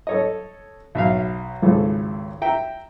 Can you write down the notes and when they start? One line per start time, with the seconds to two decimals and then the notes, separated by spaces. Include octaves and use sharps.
0.07 A4 C#5 D#5
0.95 B1 E5 F5
1.62 G#1 C#2 G#4 A4
2.42 E5 G5 A#5